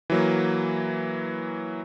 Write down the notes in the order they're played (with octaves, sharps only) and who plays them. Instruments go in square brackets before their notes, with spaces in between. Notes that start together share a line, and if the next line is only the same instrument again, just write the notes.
[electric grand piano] E3 F#3 A#3